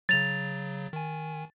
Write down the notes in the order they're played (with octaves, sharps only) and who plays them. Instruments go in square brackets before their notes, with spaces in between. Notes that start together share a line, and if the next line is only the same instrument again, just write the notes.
[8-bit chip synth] C#3 F#3 [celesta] A6 F7
[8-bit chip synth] D#3 G#5